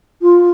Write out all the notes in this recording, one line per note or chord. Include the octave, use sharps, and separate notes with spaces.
F4